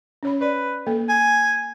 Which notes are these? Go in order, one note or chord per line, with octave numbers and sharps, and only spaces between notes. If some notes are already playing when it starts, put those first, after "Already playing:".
C#4 C#5 B5
B4 D5
A#3 A4
G#5